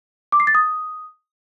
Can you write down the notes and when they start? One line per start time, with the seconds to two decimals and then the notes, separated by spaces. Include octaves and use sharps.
0.32 D6
0.40 C7
0.47 A6
0.55 D#6